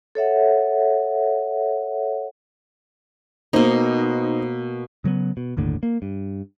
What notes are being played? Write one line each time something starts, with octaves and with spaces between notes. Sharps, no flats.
A4 C#5 E5 F#5
B2 A#3 D#4 C5
C#3 F#3 G3 B3
B2
G1 D#2 A2 D3
A#3
G2